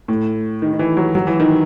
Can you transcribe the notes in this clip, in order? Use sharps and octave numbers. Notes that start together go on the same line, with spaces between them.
A2
D#3
D#3
E3
F#3
F#3
E3
D#3